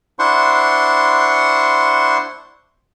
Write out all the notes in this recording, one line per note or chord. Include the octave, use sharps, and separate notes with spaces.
D4 E4 C5 F#5 C6 C#6